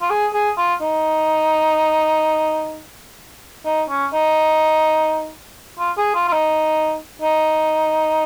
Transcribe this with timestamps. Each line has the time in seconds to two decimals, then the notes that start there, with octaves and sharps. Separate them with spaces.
0.02 F4
0.11 G#4
0.34 G#4
0.58 F4
0.82 D#4
3.66 D#4
3.90 C#4
4.13 D#4
5.79 F4
5.98 G#4
6.15 F4
6.29 F4
6.33 D#4
7.22 D#4